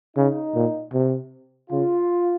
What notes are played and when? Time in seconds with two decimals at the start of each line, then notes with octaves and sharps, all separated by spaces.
0.16 C#3 D#4
0.54 A#2
0.93 C3
1.71 C#3 F4